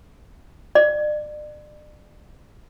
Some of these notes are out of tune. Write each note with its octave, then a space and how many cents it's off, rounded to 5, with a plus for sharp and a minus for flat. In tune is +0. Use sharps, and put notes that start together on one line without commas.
D5 +35